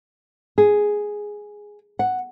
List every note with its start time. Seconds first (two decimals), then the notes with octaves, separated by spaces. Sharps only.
0.58 G#4
1.99 F#5